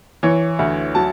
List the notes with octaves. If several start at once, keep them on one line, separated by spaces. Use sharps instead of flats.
E3 C#5
D2
F#3 A5